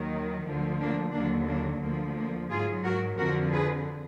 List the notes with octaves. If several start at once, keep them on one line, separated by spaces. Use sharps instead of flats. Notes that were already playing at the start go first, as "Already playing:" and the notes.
Already playing: D#2 D#3 F#3
D2 D3 F3
A#3 D4
D#2 D3 F#3 A#3 D4
A#3 D4
D2 D3 F3 A#3
A#3
G#2 F#3 F4 G#4
F#4 A#4
F2 D3 F3 F#4 A#4
G#4 B4